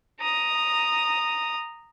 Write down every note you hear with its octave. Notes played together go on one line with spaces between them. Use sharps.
A#5 D#6